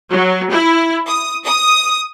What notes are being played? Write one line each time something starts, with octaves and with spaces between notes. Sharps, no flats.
F#3
E4
D#6
D#6